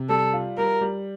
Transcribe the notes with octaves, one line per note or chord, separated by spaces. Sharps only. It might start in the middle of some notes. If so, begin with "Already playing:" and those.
Already playing: C3
G3 A4
F4
G3 A#4
G3